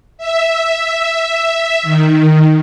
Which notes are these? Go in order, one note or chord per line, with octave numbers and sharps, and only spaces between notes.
E5
D#3